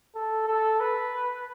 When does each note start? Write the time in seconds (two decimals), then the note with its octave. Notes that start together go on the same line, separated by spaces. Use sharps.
0.15 A4
0.48 A4
0.80 B4